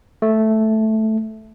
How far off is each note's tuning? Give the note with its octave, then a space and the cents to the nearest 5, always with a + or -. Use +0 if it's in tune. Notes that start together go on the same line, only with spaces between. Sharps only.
A3 -5